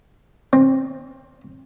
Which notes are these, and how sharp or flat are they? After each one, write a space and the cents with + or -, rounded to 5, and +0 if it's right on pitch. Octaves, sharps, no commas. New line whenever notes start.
C4 +20